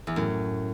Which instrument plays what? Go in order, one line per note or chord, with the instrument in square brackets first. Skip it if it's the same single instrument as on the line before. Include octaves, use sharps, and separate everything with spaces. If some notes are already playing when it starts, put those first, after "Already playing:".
[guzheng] E2
[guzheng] F#2 [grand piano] A2